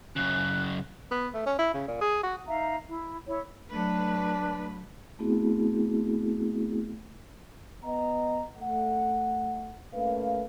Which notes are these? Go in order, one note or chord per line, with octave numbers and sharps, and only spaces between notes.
F#2 C#3 F#6
B3
A3
C#4
E4
C#3
A#2
G#4
F#4
D#4 E5 F5 A#5
E4
E4 C#5
F#3 A3 D4 B4
A3 B3 C4 E4 F#4 G#4
B3 D#5 A#5
A3 F#5
A3 A#3 C#4 B4 F5